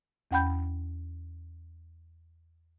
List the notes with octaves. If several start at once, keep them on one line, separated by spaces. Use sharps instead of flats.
E2 C#4 F#5 G5 B5 G6